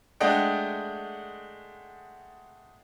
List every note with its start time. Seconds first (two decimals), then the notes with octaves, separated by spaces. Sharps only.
0.20 G#3 A3 D4 D#5 F#5 G5